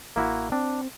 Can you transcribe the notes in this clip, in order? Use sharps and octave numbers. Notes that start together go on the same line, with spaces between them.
A1 A#3 E4 F#4
C4 D4